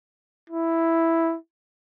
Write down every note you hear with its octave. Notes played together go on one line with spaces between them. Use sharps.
E4